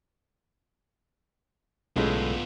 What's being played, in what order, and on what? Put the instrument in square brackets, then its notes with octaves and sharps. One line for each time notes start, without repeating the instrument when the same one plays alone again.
[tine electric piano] B1 A4 [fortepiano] A2 C#3 G#3 [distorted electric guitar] B3 F4